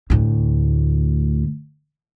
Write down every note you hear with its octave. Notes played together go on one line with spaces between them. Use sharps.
D2 A2